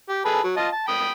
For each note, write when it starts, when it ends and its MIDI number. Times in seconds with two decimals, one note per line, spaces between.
0.09 0.24 67
0.25 0.41 68
0.25 0.41 69
0.25 0.41 71
0.44 0.53 54
0.57 0.68 65
0.57 0.68 75
0.57 0.68 81
0.72 0.87 81
0.88 1.11 79
0.88 1.11 83
0.88 1.11 87